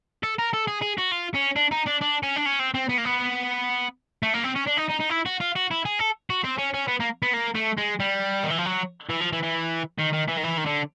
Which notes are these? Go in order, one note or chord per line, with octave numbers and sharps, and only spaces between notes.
A4
A#4
A4
G#4
G#4
F#4
F4
C#4
D4
D#4
D4
D4
C#4
D4
C#4
C4
C4
B3
A#3
B3
A3
A#3
C4
C#4
D4
D#4
D#4
D#4
E4
F#4
F4
F#4
E4
G#4
A4
F#4
C4
C#4
C#4
B3
A#3
B3
A#3
A3
G#3
G3
D#3
E3
F3
F#3
E3
F3
E3
E3
D#3
D#3
E3
D#3
E3
D#3
D3